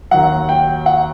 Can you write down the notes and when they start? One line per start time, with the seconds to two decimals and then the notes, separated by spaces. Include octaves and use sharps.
0.11 D#2 D#3 F#3 F#5
0.49 G5
0.86 F#5